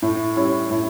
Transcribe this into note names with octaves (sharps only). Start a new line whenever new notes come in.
A2
G3 C#4 E4
A2